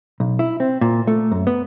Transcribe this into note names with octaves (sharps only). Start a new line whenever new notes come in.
B1
E4
C4
A#2
A3
F#2
B3